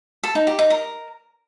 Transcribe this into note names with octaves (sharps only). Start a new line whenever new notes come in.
A4
D#4
G4
D#4
A#4